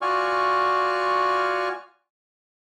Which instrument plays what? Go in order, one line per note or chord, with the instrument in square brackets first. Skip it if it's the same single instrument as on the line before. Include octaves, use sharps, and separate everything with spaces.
[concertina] F4 F#4 D5 G#5 C#6 F6